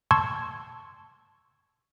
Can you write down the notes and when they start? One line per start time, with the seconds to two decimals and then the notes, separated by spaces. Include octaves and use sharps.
0.11 A5 C6 C#6 E6 G#6